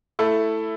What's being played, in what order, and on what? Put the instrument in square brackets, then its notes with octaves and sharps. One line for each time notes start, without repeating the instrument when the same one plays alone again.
[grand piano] A3 E4 A4